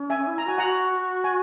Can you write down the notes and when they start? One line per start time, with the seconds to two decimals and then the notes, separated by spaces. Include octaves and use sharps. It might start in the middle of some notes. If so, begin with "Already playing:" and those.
Already playing: C#4
0.10 E5 G#5
0.27 E4
0.38 A#5
0.46 F#4 G#5
0.58 F#4 F#5 A#5
1.24 G#5